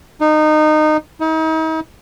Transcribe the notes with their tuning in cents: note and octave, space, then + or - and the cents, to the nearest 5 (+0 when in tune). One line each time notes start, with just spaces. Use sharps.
D#4 -20
D#4 +40